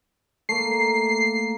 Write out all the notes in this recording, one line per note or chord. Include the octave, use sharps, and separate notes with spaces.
A3 A#3 C7